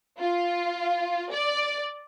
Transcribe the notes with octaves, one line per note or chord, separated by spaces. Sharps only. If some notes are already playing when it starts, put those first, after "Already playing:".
F4
D5